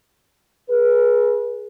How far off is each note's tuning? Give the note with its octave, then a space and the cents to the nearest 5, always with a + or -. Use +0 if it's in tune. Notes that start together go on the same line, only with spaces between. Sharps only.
G#4 +0 B4 -35